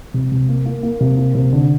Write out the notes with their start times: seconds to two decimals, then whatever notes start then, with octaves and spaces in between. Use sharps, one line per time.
0.14 C3
0.32 C3
0.48 A#3
0.66 A#3
0.83 A#3
1.00 C3
1.17 A#3
1.35 C3
1.53 D3